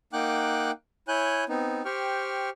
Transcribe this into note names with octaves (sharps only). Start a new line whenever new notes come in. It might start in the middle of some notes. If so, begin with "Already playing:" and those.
A#3 D#4 F#5 G5 D6 F#6
E4 C#5 G#5 F#6 G6
B3 C4 D#4
G4 C5 G5 C#6 F6